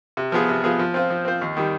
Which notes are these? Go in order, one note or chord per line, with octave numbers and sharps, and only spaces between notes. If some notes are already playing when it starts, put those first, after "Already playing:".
C3
F3 B3 F4 G#4
C3
F3 B3 F4 G#4
F3
C4 F4 C5
F3
C4 F4 C5
D#2
D#3 G3